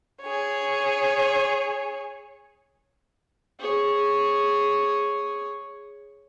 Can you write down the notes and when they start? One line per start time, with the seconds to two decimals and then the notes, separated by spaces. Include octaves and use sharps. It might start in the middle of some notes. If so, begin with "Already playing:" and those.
0.23 G#4 C#5
3.59 G#4 C#5